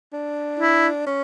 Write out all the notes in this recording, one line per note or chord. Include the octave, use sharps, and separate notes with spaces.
D4
E4
C#4